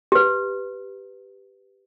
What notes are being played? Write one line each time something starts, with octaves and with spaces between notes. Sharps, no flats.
G4 B4